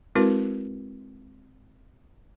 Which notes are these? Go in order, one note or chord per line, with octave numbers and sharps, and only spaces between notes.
G#3 C4 E4 F#4 A#4 B4